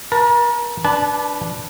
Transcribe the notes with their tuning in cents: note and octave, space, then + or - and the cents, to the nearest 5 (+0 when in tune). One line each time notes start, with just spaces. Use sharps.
A#4 +40 A5 +20
D4 +0 B4 -5 A5 -35